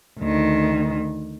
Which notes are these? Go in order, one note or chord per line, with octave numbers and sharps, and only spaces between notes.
D2 D#3